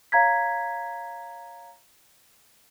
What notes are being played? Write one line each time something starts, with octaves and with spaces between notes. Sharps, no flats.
C#5 F5 A#5 G#6 B6